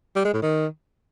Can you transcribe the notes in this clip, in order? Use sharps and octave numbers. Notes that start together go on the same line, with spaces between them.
G3
G#3
A2
D#3